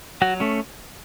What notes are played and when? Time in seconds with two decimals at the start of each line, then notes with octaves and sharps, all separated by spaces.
0.22 F#3 F#4
0.40 A3 C#4